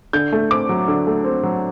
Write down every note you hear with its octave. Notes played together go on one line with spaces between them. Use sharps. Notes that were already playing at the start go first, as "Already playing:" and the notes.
D3 G6
A3
C4 D6
F#3
D3
A3
C4
F#3